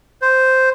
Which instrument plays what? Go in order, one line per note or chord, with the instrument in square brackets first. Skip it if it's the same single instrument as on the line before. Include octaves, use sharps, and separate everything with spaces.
[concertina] C5